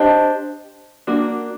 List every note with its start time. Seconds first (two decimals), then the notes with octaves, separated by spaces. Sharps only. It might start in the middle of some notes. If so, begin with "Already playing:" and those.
Already playing: D4 G4 C5 D#5
1.07 A#3 D4 F#4